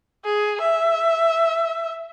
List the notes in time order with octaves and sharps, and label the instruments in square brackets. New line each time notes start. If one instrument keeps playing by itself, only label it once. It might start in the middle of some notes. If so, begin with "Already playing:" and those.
[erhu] G#4
E5